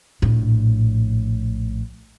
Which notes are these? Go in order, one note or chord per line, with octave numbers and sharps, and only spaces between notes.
A#1 A2